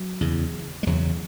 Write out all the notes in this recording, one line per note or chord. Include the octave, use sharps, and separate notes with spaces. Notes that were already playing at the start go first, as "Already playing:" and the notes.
Already playing: F#3
E2 C#3
G#3
E2 C#3 F#3